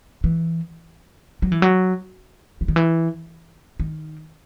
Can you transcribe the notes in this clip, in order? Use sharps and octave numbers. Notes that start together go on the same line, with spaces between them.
E3
F#3
E3
F#3
E3
D#3
E3
D#3